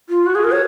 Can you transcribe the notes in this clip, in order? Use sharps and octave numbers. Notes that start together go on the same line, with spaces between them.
F4
F#4
G#4
A#4
C#5